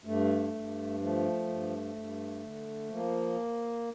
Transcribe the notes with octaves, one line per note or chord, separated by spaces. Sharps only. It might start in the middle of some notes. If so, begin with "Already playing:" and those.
G2 A3
G2
F3 A3
G2
G2
D3
F3 A#3